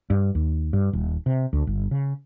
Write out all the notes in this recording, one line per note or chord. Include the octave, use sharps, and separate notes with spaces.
G2
D#2
G2
D#1
C3
D2
G1
C#3